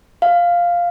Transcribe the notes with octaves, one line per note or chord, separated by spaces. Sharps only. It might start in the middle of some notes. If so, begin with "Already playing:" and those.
F5